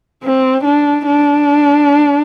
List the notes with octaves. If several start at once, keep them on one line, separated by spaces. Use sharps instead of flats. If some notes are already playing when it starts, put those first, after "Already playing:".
C4
D4
D4